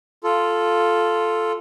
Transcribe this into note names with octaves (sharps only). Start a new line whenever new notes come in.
F4 A4